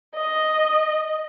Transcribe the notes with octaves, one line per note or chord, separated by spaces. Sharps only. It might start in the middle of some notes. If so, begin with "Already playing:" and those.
D#5